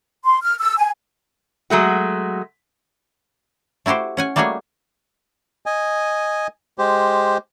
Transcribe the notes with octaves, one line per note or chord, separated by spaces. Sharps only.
C6
F6
E6
G#5
F#3 G#3 A3 F#4
A3 E4 F#4 G4 C5
C#4 F#5 G#5
G3 A3 A#3 F#4 G#4 C#5
D#5 G#5
G#3 G4 C5